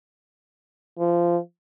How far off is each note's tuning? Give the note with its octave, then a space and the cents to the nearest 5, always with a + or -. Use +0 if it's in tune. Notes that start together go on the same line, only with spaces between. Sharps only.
F3 -20